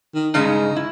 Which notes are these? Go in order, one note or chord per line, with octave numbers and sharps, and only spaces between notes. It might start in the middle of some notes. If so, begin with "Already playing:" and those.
D#3
G2 C#3 G#3 D#4
E4